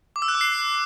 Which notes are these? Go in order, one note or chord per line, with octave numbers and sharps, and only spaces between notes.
D6
E6
F#6
D6
C7